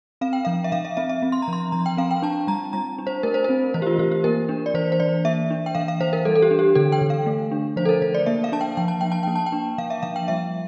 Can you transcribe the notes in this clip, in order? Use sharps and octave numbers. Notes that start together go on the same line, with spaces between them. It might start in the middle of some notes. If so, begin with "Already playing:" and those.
C4 F5
G5
F3 F5
E5
F3 F5
E5
C4 E5
E5
C4
C6
A#5
F3 C6
F3 A#5
G5
C4 F5
G5
D4 A5
G3 A#5
G3 A#5
D4
C5
A3 A#4
C5
C4 A#4
E3 C5
G4
F4
E3 G4
G4
A#3 A#4
D4
D5
E3 C5
C5
E3 D5
A#3 E5
D4
G5
E3 F5
F5
E3 C5
A#4
G3 A4
A4
G4
D4
G4
D3 A4
G5
D3
F5
A3
D4
F3 C5
A4
A#4
F3 C5
D5
A#3 E5
F5
D4 A5
G5
F3 G5
A5
F3 G5
A5
A#3 G5
A5
G5
D4
F3 F5
E5
F3 F5
G5
G3 E5